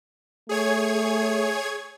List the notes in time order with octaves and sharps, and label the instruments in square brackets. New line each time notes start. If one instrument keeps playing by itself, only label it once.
[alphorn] A3 [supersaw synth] G#4 C#5 G#6